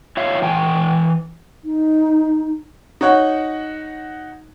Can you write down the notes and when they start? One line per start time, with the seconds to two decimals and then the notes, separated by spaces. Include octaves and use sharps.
0.17 F4 C#5 E5 F5
0.42 E3 G5 G#5
1.64 D#4
3.01 D#4 F#4 C#5 F#5